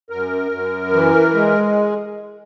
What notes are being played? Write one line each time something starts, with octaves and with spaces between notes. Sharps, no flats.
F#2 A#4
F#2
E3
G#3